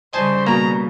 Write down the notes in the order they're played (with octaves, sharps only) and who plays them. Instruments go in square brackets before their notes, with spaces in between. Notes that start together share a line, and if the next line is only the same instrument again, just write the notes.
[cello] C#3 G3 [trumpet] C5 [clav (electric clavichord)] D#5 G#5 A5
[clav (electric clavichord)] B2 A#3 [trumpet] A#5